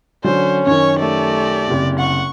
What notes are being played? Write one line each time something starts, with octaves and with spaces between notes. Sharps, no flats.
D3 F#3 C#4 D4 C5
F#2 D#3 C#5 C#6
A3 G4 D5
F#1 C3
F#5 C#6